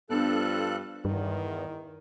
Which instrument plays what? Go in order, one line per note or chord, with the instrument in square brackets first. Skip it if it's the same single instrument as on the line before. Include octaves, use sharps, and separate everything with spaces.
[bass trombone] G2 [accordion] F3 A4 F#6 [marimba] B3 D4
[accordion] E2 [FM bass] G2 [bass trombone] D#3